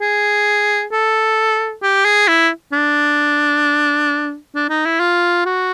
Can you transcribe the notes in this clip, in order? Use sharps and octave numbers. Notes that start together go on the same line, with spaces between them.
G#4
A4
G4
G#4
E4
D4
D4
D#4
E4
F4
F#4